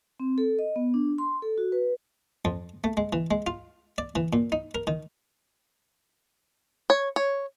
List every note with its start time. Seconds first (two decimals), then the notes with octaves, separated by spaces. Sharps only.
0.20 C4
0.38 A4
0.59 D#5
0.76 B3
0.94 D4
1.18 C6
1.42 A4
1.58 F#4
1.72 B4
2.45 F2
2.84 A3
2.97 G#3
3.13 E3
3.31 G#3
3.47 F4
3.98 D5
4.15 E3
4.33 A#2
4.52 D#4
4.75 A#4
4.87 D#3
6.90 C#5
7.16 C#5